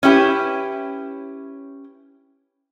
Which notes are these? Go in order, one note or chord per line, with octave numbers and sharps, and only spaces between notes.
C#4 E4 G4 B4